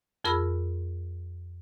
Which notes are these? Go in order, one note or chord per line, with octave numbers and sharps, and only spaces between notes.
F2 F4 G#4 A#4 B5 E6